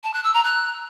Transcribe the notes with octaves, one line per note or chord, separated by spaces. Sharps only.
A5
F#6
E6
A#5
F#6